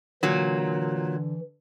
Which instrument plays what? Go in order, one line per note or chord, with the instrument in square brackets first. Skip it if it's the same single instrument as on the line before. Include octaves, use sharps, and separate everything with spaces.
[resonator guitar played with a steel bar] A#2 F#3 [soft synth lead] D3 [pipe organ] E3